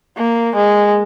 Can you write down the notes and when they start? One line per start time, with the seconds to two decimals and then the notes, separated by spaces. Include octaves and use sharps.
0.17 A#3
0.55 G#3